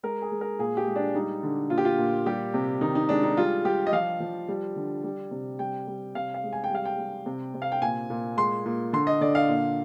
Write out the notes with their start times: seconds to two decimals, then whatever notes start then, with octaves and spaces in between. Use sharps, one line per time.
0.03 G#3 A#4
0.22 G#4
0.32 G#3
0.41 A#4
0.59 A#2 G#4
0.77 G4
0.87 G#3
0.96 D4
1.15 G3 D#4
1.43 D3
1.70 A#2 F4
1.78 G4
1.85 F4
1.98 A#2
2.26 G3 G4
2.54 C3
2.81 D#3 D#4
2.95 D#4
3.09 G#3 D4
3.23 D#4
3.37 G3 F4
3.64 G3 G4
3.87 D#5
3.92 F3 F5
4.20 F3
4.49 G3
4.76 D3
5.04 G3
5.31 C3
5.59 G3 G5
5.88 G3
6.15 C3 F5
6.34 F5
6.44 G#3
6.53 G#5
6.64 G5
6.71 G3 F5
6.85 G5
6.98 G3
7.26 C3
7.54 C3
7.62 F5
7.72 G5
7.82 A#2 G#5
8.10 A#2
8.37 G#3 C6
8.65 A#2
8.93 D3 C6
9.07 D#5
9.21 D3 D5
9.35 F5
9.49 A#2